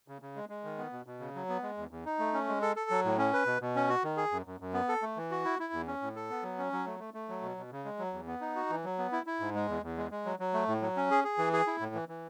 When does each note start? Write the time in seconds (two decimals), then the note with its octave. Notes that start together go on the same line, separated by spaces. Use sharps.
0.08 C#3
0.22 C#3
0.36 G#3
0.49 G#3
0.64 D#3
0.78 B3
0.93 B2
1.06 B2
1.20 C#3
1.35 F#3
1.49 B3
1.63 G#3
1.77 E2
1.91 E2
2.05 D#4
2.19 A3
2.34 C#4
2.48 G#3
2.62 A4
2.76 A4
2.90 F#3
3.05 A2
3.18 C#4
3.33 B4
3.46 B2
3.61 B2
3.76 C#4
3.89 F#4
4.04 D#3
4.17 G#4
4.31 F#2
4.46 F#2
4.60 F#2
4.73 B3
4.89 A4
5.02 A3
5.17 E3
5.31 F#4
5.45 E4
5.59 E4
5.73 E2
5.87 C#4
6.02 A2
6.16 A4
6.30 B3
6.43 F#3
6.58 C#4
6.73 F#3
6.86 A3
7.00 A3
7.14 A3
7.29 F#3
7.42 B2
7.57 B2
7.72 C#3
7.85 G#3
7.99 F#3
8.13 E2
8.27 B3
8.41 D#4
8.56 F#4
8.70 E3
8.84 F#3
8.98 B3
9.12 E4
9.26 E4
9.40 G#2
9.55 G#3
9.69 E2
9.83 E2
9.97 G#3
10.11 G#3
10.25 F#3
10.39 F#3
10.54 A3
10.68 A2
10.82 F#3
10.96 C#4
11.11 G#4
11.24 G#4
11.38 E3
11.53 G#4
11.67 E4
11.80 A2
11.94 E3
12.09 E3